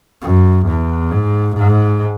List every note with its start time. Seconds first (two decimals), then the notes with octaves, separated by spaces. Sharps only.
0.22 F#2
0.67 E2
1.11 G#2
1.56 G#2